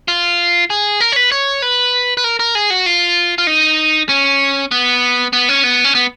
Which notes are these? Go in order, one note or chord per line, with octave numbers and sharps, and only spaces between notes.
F4
G#4
A#4
C#5
B4
C#5
B4
B4
A#4
A#4
G#4
F#4
F4
F4
D#4
C#4
B3
B3
C#4
B3
C#4
B3